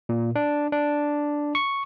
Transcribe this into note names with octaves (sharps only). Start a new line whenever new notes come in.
A#2
D4
D4
C#6